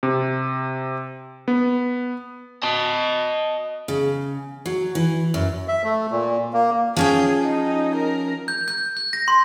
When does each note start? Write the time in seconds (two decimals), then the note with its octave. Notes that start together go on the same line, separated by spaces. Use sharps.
0.03 C3
1.48 B3
2.63 D#5 A5
3.88 C#3
4.66 F#3
4.95 E3
5.34 F#2
5.68 E5
5.84 A3
6.11 A#2
6.53 A#3
6.96 F3 C#4 G#4 G5
7.42 D#4
7.95 A#4
8.48 G6
8.68 G6
8.97 G6
9.13 A#6
9.28 C6